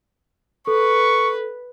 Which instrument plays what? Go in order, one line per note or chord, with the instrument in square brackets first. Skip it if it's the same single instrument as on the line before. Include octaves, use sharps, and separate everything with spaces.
[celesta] A4 [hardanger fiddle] B4 [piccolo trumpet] C#6